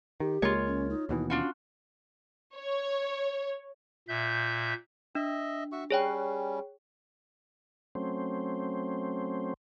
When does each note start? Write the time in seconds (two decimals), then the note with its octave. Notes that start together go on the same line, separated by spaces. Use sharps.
0.20 D#3 G4
0.42 C#2 G#3 A#3 F4 C#5
0.67 C#4
0.90 D#4
1.09 D#2 B2 E3 D#4
1.30 C#4 D4 F4 F#4
2.57 C#5
4.08 A#2 E5 G6
5.15 D4 D#5 E5
5.72 F#4 E5 C#6
5.91 G3 C#4 G#4 C#5 G5
7.95 F#3 A3 C4 C#4 C5